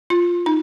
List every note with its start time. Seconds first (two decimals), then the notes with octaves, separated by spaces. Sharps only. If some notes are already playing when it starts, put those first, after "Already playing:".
0.10 F4
0.46 D#4